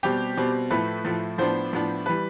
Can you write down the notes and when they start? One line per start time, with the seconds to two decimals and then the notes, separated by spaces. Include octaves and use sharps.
0.03 B2 G3 C4 G4
0.37 B2 G3 C4
0.70 A2 F3 A3 B4
1.05 A2 F3 A3
1.38 A2 F3 B3 D4 C5
1.73 A2 F3 B3 D4
2.06 E3 G3 B4